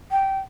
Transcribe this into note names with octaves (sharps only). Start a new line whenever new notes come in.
G5